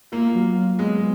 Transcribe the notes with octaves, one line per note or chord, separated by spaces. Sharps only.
A#3 F4
F#3
F4
G#3 B3